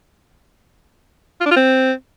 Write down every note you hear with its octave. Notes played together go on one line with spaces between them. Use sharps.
F4
D4
F4
C4